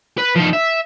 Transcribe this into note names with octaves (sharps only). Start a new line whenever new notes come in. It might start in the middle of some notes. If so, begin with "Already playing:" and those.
B4
F3 D#4
E5